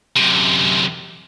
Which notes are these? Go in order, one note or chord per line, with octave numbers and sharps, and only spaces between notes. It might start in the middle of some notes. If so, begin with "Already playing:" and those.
F#2 C3